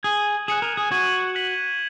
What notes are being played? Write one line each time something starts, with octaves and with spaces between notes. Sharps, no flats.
G#4 G#6 D#7 F#7
G#4 F#6 C#7 E7
A#4
G#4
F#4 G#6 D#7 F#7
F#6 B6 F#7